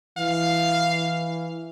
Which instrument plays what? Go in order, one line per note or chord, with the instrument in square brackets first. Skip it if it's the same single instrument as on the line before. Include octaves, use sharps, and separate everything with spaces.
[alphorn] E3 [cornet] F5